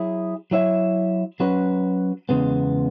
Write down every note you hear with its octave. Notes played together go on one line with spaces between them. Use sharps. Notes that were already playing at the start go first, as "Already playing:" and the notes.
Already playing: F#3 E4 G#4
F#3 E4 C#5 E5
F#3 C#4 F#4 B4
E2 C#3 G#3 B3